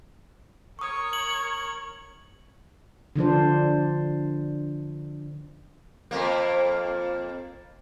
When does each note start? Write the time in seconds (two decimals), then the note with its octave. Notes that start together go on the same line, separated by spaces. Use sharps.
0.79 A#4 C#5 C#6 D#6
1.13 F#7
3.16 D3 F3 D4 C5
6.11 F2 A#3